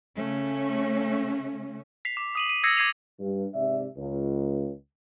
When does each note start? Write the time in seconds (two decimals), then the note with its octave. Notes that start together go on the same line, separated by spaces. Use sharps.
0.16 C#3 A3 C#4
2.05 B6 C7 F7
2.17 D6
2.35 D#6 D#7 F#7
2.49 D#7
2.63 D#6 E6 G#6 A#6 C7 C#7
2.77 D6 G#6 C7 D#7 F7
3.20 G2
3.54 G#2 C3 D5 E5
3.97 C#2